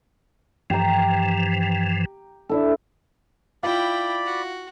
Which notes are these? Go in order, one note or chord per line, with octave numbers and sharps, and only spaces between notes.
G2 E3 F3 G4 A#5
D4 E4 A4
E4 F4 D5 G5 B5
F#4